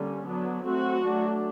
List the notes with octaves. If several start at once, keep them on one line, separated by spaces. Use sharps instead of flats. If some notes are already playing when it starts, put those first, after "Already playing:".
Already playing: D3 G3 A#3 C#4
F#3 B3 D4
F#3 A3 C4 F#4
F#3 A3 D4